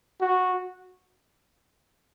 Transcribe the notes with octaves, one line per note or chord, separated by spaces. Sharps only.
F#4